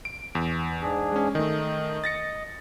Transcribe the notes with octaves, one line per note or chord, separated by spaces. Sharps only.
D7
E2
G#2 D4 G#4
G#3 C#4
D#3 A3 D#5
A6 A#6 C#7